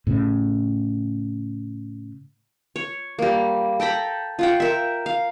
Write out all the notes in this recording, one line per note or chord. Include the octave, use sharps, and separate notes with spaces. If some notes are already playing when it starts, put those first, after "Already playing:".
A2 C#3
C#5
G3 A#3
A4 G5 A#5 B5
F4 F#5 G5
A#4 E5
F5